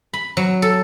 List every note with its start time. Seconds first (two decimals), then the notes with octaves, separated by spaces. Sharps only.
0.13 B5
0.37 F#3
0.62 A4